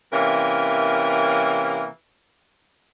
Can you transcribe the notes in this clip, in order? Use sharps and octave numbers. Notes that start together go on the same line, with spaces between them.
C3 E3 A#3 C#4 A#4